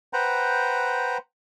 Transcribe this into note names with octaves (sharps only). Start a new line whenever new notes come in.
B4 C5 F#5 G5 A#5